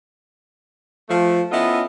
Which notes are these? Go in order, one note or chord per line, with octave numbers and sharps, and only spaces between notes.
F3 A3
B3 C#4 E4 F4 A4 D#5